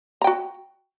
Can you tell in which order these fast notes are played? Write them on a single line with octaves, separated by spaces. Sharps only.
A#5 G5 F#4